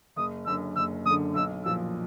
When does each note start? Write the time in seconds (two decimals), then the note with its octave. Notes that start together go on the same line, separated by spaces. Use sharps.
0.16 F#1 D#6
0.46 F#2 D3 E6
0.76 F#1 E6
1.05 F#2 D#6
1.10 D3
1.35 B1 E6
1.65 A#2 F3 E6